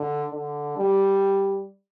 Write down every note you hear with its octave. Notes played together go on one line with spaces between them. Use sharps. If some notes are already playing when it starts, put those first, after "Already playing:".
Already playing: D3
D3
G3